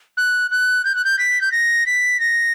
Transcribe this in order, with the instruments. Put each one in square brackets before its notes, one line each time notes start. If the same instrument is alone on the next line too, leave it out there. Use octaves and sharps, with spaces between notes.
[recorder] F#6
F#6
G6
F#6
G6
B6
G6
A#6
B6
A#6